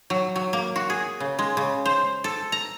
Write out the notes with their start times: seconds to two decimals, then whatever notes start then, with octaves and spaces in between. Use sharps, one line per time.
0.10 F#3
0.36 F#3
0.53 A#3
0.76 F#4
0.90 G#4
1.20 C#3
1.39 G#3
1.57 C#3
1.86 C5
2.24 A4
2.52 A#5